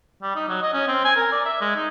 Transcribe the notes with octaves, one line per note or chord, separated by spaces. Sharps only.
G3
D#4
F#3
D#5
C#4
C4
G#5
A#4
D5
E5
G#3
D#4